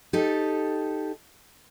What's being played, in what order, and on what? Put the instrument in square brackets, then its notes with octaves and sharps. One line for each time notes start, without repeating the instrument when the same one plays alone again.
[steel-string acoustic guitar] D#4 G4 A4